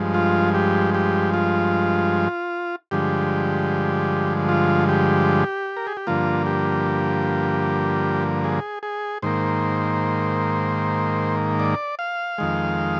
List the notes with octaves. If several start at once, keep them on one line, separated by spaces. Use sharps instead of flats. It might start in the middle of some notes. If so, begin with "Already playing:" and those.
Already playing: G2 F3 G#3
F4
G4
G4
F4
G2 D3 F3 G#3 G4
F4
G4
A#4
G#4
G4
G2 D3 F3 A#3 F4
G4
G#4
G#4
G#2 D#3 A#3 C5
D5
F5
F2 D#3 G#3